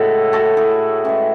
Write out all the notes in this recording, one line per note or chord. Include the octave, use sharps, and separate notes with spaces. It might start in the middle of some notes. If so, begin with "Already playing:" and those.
Already playing: A2 G#3 C#4 E4 F#4 A4
A2 G#3 F#4 A4
E4 G#4
A2 E3 G#3 C#4